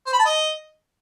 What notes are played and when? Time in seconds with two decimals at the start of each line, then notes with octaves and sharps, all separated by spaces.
0.06 C5
0.13 B5
0.19 A5
0.26 D#5